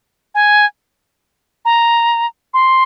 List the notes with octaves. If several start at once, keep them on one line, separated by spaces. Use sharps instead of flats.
G#5
A#5
C6